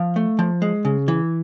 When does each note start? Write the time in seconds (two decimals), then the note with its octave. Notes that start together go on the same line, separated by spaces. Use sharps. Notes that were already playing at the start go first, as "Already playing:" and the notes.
Already playing: F3 F5
0.16 A3
0.39 F3
0.62 G#3
0.85 C#3
1.08 E3